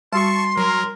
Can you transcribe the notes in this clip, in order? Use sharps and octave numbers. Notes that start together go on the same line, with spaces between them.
G3 F#4 A5 C6 C#6
F#3 A#4